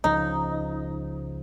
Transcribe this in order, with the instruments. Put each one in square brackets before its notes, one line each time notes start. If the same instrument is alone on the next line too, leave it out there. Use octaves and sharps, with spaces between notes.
[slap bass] C#2 C#3 F3 [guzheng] D#4